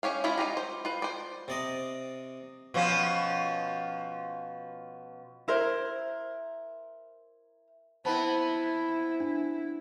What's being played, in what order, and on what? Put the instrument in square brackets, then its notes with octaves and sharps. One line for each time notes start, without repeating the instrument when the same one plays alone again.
[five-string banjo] C#4 G4 C#5 F5
G#3 C#4 E4 F4 B5
D#4 F4 G4 A#5
C5
F4 B4
C5 D5
[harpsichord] C3 D5 D#5
[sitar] B2 F3 C#4
[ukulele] E4 A#4 C5
[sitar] B3 C4 [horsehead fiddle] E4 [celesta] C5 A5 B5
[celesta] D4